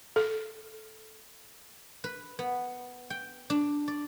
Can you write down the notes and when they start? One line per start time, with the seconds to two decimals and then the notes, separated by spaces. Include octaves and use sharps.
0.16 A4
2.04 B4
2.39 B3
3.10 G5
3.50 D4
3.88 D5